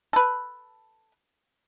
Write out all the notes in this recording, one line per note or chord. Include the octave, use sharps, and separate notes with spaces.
A4 B4